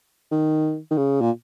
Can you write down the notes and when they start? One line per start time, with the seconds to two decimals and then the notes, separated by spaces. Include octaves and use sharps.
0.31 D#3
0.91 D#3
0.97 C#3
1.21 A#2